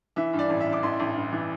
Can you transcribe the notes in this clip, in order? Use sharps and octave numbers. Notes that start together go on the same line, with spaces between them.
E3 E5
G2
D5
A1
E5
G2
D6
A1 C6
A1
G2
E3